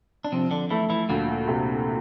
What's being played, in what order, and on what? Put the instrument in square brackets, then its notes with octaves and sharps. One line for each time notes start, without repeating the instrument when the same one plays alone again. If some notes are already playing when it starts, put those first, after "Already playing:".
[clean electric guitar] D4
[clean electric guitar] C3 C4 [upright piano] F3
[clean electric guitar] D3 D4
[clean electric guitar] E3 E4 [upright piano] A3
[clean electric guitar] E3 E4
[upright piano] D2 [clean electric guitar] A#2 A#3
[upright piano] C3